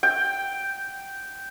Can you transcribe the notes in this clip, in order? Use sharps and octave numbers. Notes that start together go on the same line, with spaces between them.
G5